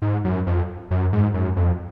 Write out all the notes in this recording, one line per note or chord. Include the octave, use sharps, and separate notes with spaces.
G#2
F#2
F2
F#2
G#2
F#2
F2